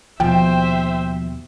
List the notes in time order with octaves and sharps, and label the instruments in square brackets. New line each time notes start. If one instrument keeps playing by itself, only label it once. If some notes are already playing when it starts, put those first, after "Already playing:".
[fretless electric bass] D#2 B2 [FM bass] F3 [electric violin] C5 E5 [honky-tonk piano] G5